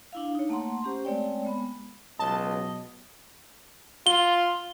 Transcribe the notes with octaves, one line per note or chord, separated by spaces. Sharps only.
D4 E4 F5
D#4 C#5
A3 A#3 F#5 A#5 C6
C#4 G4 C5
G#3 A3 C4 C#5 D5 G5
G#3 B3 B5
C#2 B2 F#3 D#5 A5
F4 G7